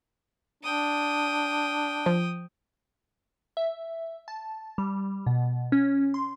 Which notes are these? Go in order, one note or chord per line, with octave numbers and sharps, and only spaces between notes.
D4 G5 D#6
F3
E5
A5
G3
B2
C#4
C6